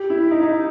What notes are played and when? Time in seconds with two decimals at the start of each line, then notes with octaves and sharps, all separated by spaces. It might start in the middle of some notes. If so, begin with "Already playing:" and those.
Already playing: G4
0.10 E4
0.31 D#4
0.42 D#4